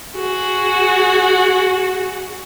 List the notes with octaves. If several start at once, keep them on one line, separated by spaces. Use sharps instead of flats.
F#4 G#4